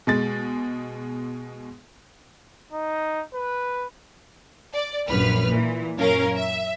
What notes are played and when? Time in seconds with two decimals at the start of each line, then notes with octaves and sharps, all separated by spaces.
0.07 B2 G#3 A6
2.73 D#4
3.34 B4
4.73 D5
5.08 A#1 F#2 B4 F6
5.51 A#2 E3
5.98 F#2 C#4 A#4 F5
6.35 E5